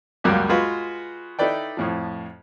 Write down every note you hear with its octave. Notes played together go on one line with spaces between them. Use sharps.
C#2 F#2 F#3 G3 A#3 G4
G#3 F4 F#4 B4
D#4 E4 A4 B4 D5 G5
F2 A2 F3